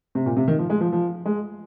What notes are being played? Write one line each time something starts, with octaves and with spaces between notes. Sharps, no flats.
C3
A#2
C3
D#3
F3
G#3
F3
F3
G#3